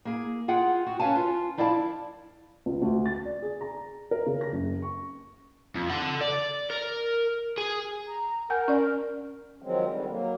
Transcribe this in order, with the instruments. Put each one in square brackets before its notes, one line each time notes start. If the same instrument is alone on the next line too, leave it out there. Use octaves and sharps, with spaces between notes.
[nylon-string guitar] A#3 G#4
F4 G#4 F#5 G5
F#4
C#4 B4 C#5 F5 G#5 A5
F4
F3 E4 D5 F5 F#5 A5
[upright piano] C#2
D2
A6
D5
G#4
A#5
A#4
C#3
A#6
F#1
C#6
[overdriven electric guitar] F2
A4 F#5
D5
A#4
G#4
[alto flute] A#5
[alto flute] A#4 [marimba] F#5 G#5 G6
[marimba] C#4 D5
[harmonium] D#3 F3 F#3 G#3 C4
D3 D#3 G3
F#3 A#3